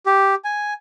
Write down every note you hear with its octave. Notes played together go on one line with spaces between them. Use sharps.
G4
G#5